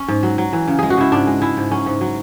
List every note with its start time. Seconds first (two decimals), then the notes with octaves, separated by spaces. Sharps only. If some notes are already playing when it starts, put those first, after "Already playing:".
Already playing: C#4
0.08 G#2
0.23 F#3
0.38 F#3
0.53 E3
0.68 C#3
0.79 G#3 G#4
0.90 F#4
0.98 C#3 E4
1.12 G#2 D4
1.27 G#3
1.42 G#3 E4
1.57 G#2
1.71 F#3 C#4
1.86 G#2
2.01 F#3